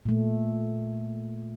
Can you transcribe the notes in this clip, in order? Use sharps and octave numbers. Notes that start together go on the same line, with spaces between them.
A#2 A3